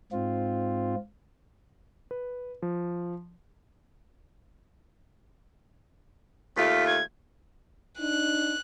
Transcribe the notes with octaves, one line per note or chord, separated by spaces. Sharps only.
G#2 C4 F4
B4
F3
D#2 A3 F4 B6
G#6
D4 D#4 F#6